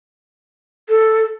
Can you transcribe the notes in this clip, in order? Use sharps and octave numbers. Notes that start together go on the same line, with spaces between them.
A4